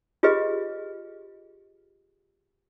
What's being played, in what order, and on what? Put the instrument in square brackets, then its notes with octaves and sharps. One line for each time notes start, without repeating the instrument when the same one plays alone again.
[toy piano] F4 G4 G#4 B4 D#5